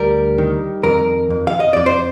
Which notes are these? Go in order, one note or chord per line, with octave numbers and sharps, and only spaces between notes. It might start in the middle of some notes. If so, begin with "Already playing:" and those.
Already playing: D2 G3 A#4
D#3
F2 A#4
F2
F5
D#5
F2 D5
C5